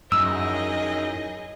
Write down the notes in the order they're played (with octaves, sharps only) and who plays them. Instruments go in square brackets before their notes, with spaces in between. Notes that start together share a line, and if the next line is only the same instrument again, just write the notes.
[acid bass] F#2 [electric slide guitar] D#4 E4 A#4 [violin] G#4 D#5 [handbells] E6